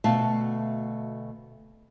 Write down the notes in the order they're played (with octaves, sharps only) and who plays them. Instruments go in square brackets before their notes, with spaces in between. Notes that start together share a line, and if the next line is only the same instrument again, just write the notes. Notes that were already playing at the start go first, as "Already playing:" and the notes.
[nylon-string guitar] D2 B2 A3 E5 F5 A5